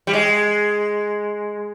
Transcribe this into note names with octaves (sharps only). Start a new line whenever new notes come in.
G3
G#3